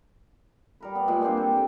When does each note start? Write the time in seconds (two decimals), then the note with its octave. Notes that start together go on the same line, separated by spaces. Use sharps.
0.80 G3 A#4 B4
0.95 B3 D5
1.08 A#2 G#3
1.21 G3 A#3 C4 D4
1.37 C4 A4
1.52 C3 G5